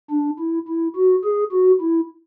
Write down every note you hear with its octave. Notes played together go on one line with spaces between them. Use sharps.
D4
E4
E4
F#4
G#4
F#4
E4